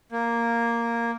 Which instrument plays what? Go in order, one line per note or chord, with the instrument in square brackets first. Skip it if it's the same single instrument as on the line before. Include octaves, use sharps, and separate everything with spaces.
[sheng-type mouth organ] A#3